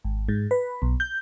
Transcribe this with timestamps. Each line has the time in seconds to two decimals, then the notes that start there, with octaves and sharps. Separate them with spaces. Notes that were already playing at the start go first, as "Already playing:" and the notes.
0.05 G#1
0.29 G#2
0.51 B4
0.82 B1
1.00 G6